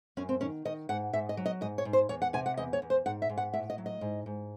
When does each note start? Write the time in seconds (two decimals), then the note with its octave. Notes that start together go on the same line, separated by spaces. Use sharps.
0.17 F#2 C#4
0.29 C4
0.41 D#3 C#4
0.65 D#3 D#5
0.89 G#2 F#5
1.13 G#2 E5
1.29 D#5
1.37 F#3
1.46 D#5
1.61 G#2 D#5
1.78 C#5
1.85 G#2
1.93 C5
2.09 E2 C#5
2.22 F#5
2.33 C3 G#5
2.46 F#5
2.57 E2 D#5
2.73 C#5
2.82 E2
2.90 C5
3.06 G#2 F#5
3.22 E5
3.29 G#2
3.38 F#5
3.53 A2 E5
3.70 D#5
3.78 F#3
3.86 D#5
4.01 G#2
4.26 G#2